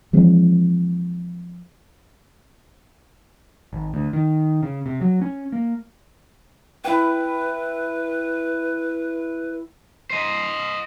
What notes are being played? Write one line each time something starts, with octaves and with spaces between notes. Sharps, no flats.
E3 F3 G#3 C4
G#1
D2
D#3
C#3
C3
F#3
C#4
A#3
E4 B4 G5
C5 D#5